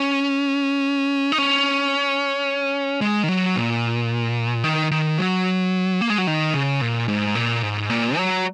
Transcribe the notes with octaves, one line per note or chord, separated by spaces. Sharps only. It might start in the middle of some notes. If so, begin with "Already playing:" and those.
Already playing: C#4
D#4
C#4
G#3
D#3
F#3
A#2
D#3
D#3
F#3
A#3
G#3
F#3
D#3
C#3
A#2
G#2
A#2
G#2
A#2
F#3